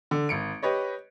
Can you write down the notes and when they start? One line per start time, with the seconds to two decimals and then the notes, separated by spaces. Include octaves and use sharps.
0.11 D3
0.29 G#1 C#7 D7
0.63 G4 B4 C#5 D#5